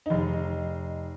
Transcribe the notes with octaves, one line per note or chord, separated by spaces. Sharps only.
F1 D#4